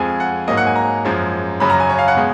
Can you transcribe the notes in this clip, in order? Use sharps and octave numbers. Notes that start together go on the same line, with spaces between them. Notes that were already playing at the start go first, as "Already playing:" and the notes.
Already playing: F2 F3 G#3 G#5
F#5
G#2 F#3 A#3 D#5
F#5
G#5
A#5
F#2 F3 G#3
F#2 C#3 F#3 B5
A#5
G#5
C#5
F5
F#5
B2 G#3